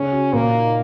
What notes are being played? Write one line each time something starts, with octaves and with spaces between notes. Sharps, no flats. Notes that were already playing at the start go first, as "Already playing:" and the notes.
Already playing: C#3 C#4
F#4
A#2 A#3
D#4